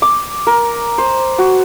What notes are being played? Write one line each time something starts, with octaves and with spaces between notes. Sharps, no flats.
D6
A#4
C5
F#4